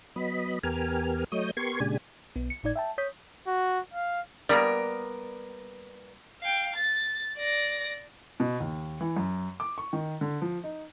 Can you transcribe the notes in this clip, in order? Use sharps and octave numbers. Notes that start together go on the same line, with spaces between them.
F#3 B3 D#5 B5
E2 B3 G4 A#4 G#5 F6
F#3 A3 C#5 D#5 D#6 G6
B3 G4 A#4 C6 C#6 G#6
A#2 C#3 G#3 D4 G4 G#5
B1 B3
C#7
G#1 A2 D#4 D5 G#6
E5 G5 A5
C#5 D#6 G6 B6
F#4
F5
G3 A#3 B3 A#4 D5
F5 G5
A6
D5 A#6
B2
D#2
E3
F#2
D6
C#6
D#3
D3
F3
D#4